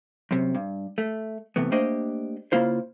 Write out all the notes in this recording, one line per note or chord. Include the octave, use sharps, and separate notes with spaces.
F#2 C3
G2
A3
C3 E3 A3 B3
A3 A#3 D4 G4 C5 D#5
C#3 A#3 E4 F4 C5